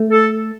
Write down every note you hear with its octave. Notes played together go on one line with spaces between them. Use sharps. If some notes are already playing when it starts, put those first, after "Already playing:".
Already playing: A3
A4